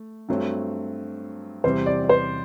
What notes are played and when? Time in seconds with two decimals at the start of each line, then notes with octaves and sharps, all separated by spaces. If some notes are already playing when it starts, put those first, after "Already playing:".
Already playing: A3
0.29 G2 F#3 A3 C4
1.64 E2 C3 G3 C4 C5
1.86 D5
2.04 D5
2.09 C5